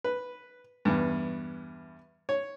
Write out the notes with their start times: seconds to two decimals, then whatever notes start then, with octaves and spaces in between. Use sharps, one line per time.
0.04 B4
0.85 E2 G2
2.29 C#5